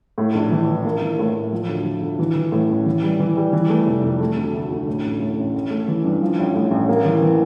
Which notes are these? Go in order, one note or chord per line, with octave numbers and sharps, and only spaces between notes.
A2
A#1
E3
E3
A#3
E3
A2
A2
F3
D2
F3
D2
E3
E3
A2
A1
E3
G3
E3
G3
E3
A3
F1
F2
A3
D2
D2
D2
A2
A1
A2
A1
A1
A3
E3
G2
F3
A1
A2
A1
A#3
E3
E3